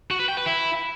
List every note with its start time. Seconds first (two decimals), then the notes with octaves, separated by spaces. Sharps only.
0.11 F#4
0.20 B4
0.28 G5
0.37 B4
0.46 E4